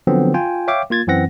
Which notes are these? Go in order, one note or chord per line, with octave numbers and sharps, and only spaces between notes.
D3 F3 F#3 B3 C4
F4 G5 G#5
C#5 E5 F5 G5 D6
A#3 F4 G#6 A6
F#2 E3 C4 F#5 A#6